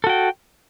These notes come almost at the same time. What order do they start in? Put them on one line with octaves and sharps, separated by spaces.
A4 F#4 G5